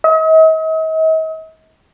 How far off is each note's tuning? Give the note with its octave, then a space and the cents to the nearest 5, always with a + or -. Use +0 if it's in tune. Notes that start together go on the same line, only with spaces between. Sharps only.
D#5 +45